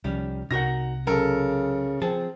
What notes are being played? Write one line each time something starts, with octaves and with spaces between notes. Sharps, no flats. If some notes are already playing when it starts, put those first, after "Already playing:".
C2 D#3 F3 G3 C#4
C2 C3 D#4 F#4 A#4 F#5 A#6
C#3 F#3 A4 A#4
F3 C4 G#4 A5